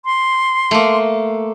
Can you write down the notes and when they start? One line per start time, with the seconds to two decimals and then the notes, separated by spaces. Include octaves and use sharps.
0.05 C6
0.71 A3 A#3